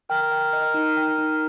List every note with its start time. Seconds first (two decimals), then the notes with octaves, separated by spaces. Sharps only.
0.10 A#4 G5
0.32 G5
0.53 D#5
0.74 D#4
0.97 G5
1.18 D#4